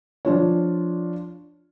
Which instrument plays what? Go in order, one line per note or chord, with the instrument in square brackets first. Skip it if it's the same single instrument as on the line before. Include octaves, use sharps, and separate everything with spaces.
[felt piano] F3 D4 F4 C#5